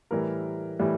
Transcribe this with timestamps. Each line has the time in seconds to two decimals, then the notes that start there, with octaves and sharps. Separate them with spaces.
0.11 A2 E3 G3 A#4
0.80 A2 E3 G3